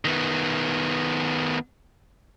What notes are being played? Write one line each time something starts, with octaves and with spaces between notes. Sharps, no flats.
D#3 B3